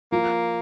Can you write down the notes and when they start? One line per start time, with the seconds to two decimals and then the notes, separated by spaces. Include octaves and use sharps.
0.12 F3 A#3